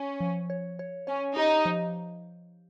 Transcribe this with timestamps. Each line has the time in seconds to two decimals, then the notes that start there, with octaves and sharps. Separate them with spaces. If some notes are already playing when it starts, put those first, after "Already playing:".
Already playing: C#4
0.20 F3
0.50 C#5
0.79 C#5
1.07 C#4 C#5
1.37 D#4 G4
1.65 F3